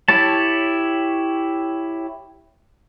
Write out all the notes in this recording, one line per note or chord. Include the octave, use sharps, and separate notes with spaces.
E4 G4 C#5 A5